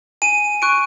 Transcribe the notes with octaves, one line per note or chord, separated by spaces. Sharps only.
G#5 D#7
C#6 F#6 D7